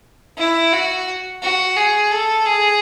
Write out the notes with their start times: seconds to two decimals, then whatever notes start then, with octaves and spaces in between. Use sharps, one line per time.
0.38 E4
0.73 F#4
1.42 F#4
1.77 G#4
2.11 A4
2.46 G#4